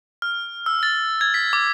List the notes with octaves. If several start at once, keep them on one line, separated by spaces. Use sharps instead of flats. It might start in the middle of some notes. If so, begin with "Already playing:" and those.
F6
E6
A6
G#6
B6
D6